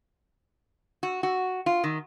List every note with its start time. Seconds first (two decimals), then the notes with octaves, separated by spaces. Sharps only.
1.03 F#4
1.23 F#4
1.66 F4
1.84 D#3